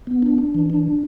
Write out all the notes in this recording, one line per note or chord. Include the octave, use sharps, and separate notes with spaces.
B3
D4
D4
E3
D4